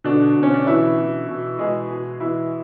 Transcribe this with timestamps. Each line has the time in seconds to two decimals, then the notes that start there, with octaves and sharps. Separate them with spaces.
0.04 B2 D3 D4
0.36 B2
0.43 C#4
0.54 D4
0.67 B2 E3 E4
0.98 B2
1.28 B2
1.58 B2 G#3 G#4
1.90 B2
2.20 B2 E3 E4